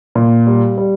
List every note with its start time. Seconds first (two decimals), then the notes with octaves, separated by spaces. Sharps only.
0.15 A#2
0.47 G3
0.78 G3